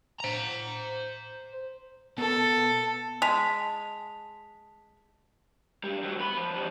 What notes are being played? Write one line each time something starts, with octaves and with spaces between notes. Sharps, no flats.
C5 A#5
B2 A4
G#3 A5 B6 F7
G2 G3
D#3 F#3
B3 B5
F3
F3 G3